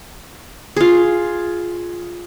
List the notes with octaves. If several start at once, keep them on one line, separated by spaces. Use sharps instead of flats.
F4 G#4